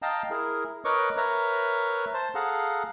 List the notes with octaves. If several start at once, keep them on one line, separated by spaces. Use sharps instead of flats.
D#5 F5 G5 A5 A#5
E4 G#4 A#4
A#4 B4 C#5 D#5 C#6 D6
A#4 B4 C#5 E5 A#5
C5 A5
G#4 A4 F5 F#5 A#5